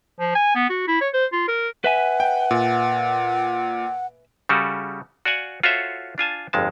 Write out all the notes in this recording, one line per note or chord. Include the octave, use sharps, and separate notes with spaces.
F3
G#5
B3
F#4
E4
C#5
C5
F4
A#4
B4 E5 F#5 G#5
G5
A#2
C#3 G3 F#4 A4
F#4 D5 F5 F#5 G#5
F4 F#4 A4 C5 C#5 E5
D4 F4 G#5 A5
G1 F2 G#3 A5